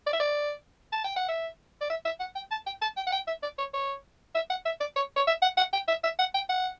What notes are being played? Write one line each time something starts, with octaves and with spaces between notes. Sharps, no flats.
D5
E5
D5
A5
G5
F#5
E5
D5
E5
E5
F#5
G5
A5
G5
A5
G5
F#5
G5
E5
D5
C#5
C#5
E5
F#5
E5
D5
C#5
C#5
E5
F#5
F#5
G5
E5
E5
F#5
G5
F#5